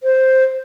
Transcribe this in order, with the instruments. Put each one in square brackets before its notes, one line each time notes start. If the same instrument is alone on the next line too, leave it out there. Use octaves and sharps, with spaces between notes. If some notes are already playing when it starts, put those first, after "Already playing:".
[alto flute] C5